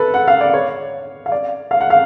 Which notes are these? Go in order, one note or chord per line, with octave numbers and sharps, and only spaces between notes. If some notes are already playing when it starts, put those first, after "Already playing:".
Already playing: A4 B4
F#5
F5
D5
C#5
F5
D5
F5
F#5
F5